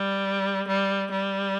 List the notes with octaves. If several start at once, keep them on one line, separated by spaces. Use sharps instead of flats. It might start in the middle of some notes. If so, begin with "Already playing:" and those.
Already playing: G3
G3
G3